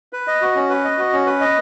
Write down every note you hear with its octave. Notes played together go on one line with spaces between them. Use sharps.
B4
D#5
F#4
C#4
B4
D#5
F#4
C#4
B4
D#5